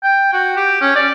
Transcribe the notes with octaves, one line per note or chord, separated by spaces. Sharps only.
G5
F#4
G4
C#4
D5